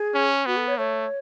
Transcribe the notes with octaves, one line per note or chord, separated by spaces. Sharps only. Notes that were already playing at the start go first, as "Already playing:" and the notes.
Already playing: G#4
C#4
B3 F#4
A4
C#5
A3 C#5